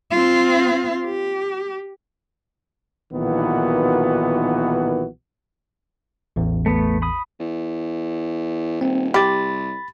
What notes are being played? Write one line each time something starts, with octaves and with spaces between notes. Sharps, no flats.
C4 F4
G4
B1 A#2 D#3 E3 B3 F#4
A1 E2
A3 B3
B5 D#6
E2
D#1 C4
C2 G4 B5 A6